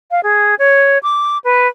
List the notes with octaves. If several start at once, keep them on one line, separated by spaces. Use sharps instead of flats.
F5
G#4
C#5
D6
B4